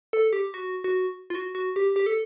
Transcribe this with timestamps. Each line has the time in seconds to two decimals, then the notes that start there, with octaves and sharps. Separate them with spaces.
0.13 A4
0.33 G4
0.54 F#4
0.84 F#4
1.30 F4
1.35 F#4
1.55 F#4
1.76 G4
1.96 G4
2.06 A4